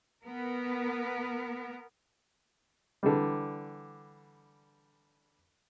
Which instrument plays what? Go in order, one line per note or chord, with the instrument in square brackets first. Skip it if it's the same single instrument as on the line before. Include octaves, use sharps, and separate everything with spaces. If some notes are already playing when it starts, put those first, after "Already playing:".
[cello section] B3 A#4
[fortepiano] D3 E3 G3